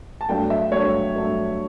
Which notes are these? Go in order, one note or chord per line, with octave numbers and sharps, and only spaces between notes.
A5
G2 F#3 A3 G5
E5
G2 F#3 A3 C#5
G2 F#3 A3